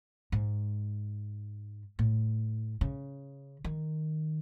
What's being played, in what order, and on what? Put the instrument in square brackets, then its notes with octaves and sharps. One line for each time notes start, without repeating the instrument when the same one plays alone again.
[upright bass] G#2
A2
C#3
D#3